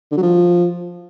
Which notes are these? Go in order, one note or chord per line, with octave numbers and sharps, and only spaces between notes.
D3
F#3
F3